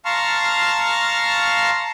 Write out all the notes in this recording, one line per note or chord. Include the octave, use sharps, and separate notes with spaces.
F5 A5 A#5 C6 C#6 F6